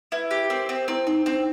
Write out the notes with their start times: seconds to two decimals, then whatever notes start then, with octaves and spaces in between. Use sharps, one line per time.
0.12 E4 B4
0.31 G4
0.50 C4 A#4
0.69 C4
0.88 C4 E4
1.07 C4 D#4
1.26 C4 D4